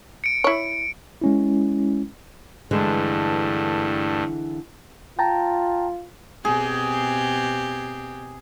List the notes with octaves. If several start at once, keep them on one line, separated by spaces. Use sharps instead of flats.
C#7 D7
E4 C#5
G#3 C#4 E4
G2 D3 E3 G#3 A3
F4 G5 A5 A#5
B2 C4 G4 G#4